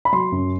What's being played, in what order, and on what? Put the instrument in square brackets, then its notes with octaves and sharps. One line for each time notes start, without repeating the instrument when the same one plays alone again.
[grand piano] B5
F#3 C6
F#2